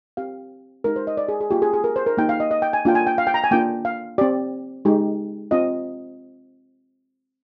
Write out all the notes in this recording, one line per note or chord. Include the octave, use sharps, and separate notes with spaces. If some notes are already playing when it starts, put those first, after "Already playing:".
C4 G4 F5
G#3 D#4 G4 A#4
C5
D#5
D5
G#4
G#4
A#3 F4 G4
G#4
G#4
A#4
C5
A#4
A#3 D#4 G4 G5
F5
D#5
D#5
G5
G#5
A#3 D4 F4 G5
G#5
G5
F5
G5
A#5
G#5
A#3 D4 F4 G5
F5
C4 G4 D5
G#3 D#4 G4
C4 F4 D#5